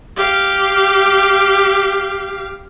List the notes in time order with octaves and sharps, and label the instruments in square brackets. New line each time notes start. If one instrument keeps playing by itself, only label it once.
[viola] G4 F5